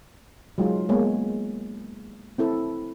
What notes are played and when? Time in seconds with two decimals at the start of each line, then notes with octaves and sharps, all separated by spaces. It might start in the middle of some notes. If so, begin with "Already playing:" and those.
0.58 F#3 G#3 D#4 F4
0.89 G#3 A#3 B3 C#5
1.05 A#3
2.38 C4 E4 A4